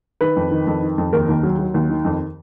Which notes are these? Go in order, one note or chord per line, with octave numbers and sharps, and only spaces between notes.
D#3 B4
F2
D#3
F2
D#3
F2
D#2 A#4
D#2
F#3
F#3
D#2
D#3
F2